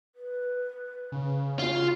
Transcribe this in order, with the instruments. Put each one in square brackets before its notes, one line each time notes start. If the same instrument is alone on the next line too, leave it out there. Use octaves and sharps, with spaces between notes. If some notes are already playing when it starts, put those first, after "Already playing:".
[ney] B4
[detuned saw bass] C#3
[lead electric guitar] F4 [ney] F#4